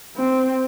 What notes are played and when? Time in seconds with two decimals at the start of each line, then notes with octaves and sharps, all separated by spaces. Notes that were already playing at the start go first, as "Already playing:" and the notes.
0.16 C4